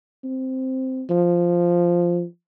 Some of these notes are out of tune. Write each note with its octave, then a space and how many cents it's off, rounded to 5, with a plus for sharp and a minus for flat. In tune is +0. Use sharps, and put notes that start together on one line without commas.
C4 -5
F3 -5